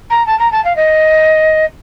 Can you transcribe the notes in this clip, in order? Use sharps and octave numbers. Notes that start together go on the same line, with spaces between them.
A#5
A5
A#5
A5
F5
D#5